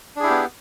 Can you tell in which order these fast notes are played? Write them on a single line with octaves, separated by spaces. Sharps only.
D4 G#4 E4 G4 B3